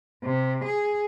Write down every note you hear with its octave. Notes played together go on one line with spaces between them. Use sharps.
C3
G#4